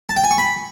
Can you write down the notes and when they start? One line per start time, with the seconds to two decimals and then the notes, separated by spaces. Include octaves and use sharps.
0.09 A5
0.17 G5
0.24 G#5
0.31 C#6
0.38 B5